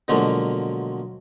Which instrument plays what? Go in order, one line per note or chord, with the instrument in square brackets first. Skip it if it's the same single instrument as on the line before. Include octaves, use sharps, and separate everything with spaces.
[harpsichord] B2 D3 F3 F#3 G#3 A#3